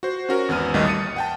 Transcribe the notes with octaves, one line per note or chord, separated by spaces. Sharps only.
F#4 C5
C#4 F#4 A#4
G#1 E2 B3 F6 D#7
A1 D#2 A2 D#3 G3 D#5
D#6 A6 C#7 D#7
F#5 G5 A5